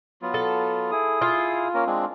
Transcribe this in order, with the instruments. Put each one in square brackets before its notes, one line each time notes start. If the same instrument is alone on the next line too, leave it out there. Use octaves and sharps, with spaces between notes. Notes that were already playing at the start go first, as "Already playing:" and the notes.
[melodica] F#3 B3 F4
[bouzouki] A4
[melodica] E4 G#4 D#6
[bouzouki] F4
[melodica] A#3 C#4 A#4
G#3 C4 D4